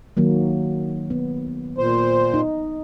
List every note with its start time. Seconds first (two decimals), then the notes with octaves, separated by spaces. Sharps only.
0.17 D#3 F#3 A#3
1.10 B3
1.78 A#2 C5
2.34 D#4